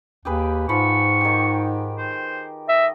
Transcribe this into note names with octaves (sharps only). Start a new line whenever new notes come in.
D#2 G4 G#4 B4
G#2 F3 B5 C#6
D#3 G4
C5
D#5 E5